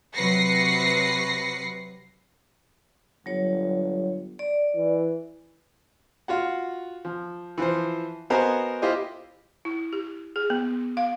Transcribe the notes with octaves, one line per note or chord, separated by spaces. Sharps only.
C3 F#3 B4 A#6 C7 C#7
G1 F#3 C#5
D5
E3
F4 F#4 F#5
F3
E3 F3 C5
B3 F#4 A#4 C5 D#5 G#5
E4 F4 G4 C5 D#5
E4
G4
G#4
B3
F5